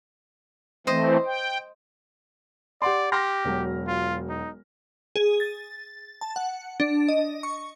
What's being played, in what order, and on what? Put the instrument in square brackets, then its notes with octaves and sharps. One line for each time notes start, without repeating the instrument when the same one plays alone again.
[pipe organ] E3 A3 C4 [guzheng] C5 D#5
[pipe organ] G5
[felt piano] G4 F#5 C6 [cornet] D5
[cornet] G4 [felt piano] C6 F6 A#6
[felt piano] E1 F#3
[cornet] F4
D#4
[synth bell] G#4
A6
A5
F#5
D4
D#5
C#6